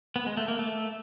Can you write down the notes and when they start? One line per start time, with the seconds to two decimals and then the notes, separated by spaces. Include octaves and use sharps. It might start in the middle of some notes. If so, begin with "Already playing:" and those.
0.16 B3
0.26 G#3
0.37 A3
0.48 A#3
0.59 A3